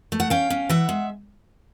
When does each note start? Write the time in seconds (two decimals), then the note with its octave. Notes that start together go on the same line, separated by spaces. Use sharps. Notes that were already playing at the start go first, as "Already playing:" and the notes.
0.12 A3
0.20 F#5
0.30 C#4 F5 G5
0.50 C#4
0.69 E3 E5 F#5
0.89 G#3